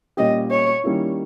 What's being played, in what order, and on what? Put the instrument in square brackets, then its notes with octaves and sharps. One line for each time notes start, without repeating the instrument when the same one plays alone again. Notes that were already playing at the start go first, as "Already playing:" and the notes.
[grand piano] A#2 G3 C#4 G4 [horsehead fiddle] D#5
[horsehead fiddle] C#5
[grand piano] D#3 G3 A#3 C#4 E4